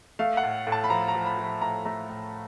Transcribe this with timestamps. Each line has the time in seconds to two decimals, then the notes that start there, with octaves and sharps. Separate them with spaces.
0.19 A3 F5
0.37 F#5
0.43 A2
0.67 A2
0.72 A5
0.84 B5
0.90 F3 A#5
1.08 A#5
1.15 F3
1.26 B5
1.38 F3
1.44 B5
1.61 A2 A#5
1.85 A3 A#5
2.09 A2